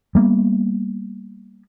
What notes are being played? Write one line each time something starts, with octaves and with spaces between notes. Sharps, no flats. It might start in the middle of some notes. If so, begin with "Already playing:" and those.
G3 A#3 B3